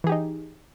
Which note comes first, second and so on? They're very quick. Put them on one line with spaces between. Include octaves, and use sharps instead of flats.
E3 G#4 G4 D#4